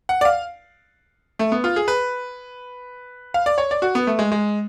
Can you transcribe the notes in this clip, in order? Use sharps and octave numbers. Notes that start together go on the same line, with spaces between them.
F#5
D5
F5
A3
B3
F4
G#4
B4
F5
D5
C#5
D5
F#4
B3
A3
G#3
G#3